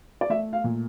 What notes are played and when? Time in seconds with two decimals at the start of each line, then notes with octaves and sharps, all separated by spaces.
0.21 D5
0.30 A3 E5
0.53 F5
0.64 A#2